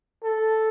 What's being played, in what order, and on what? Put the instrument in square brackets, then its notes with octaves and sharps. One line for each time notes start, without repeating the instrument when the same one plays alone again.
[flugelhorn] A4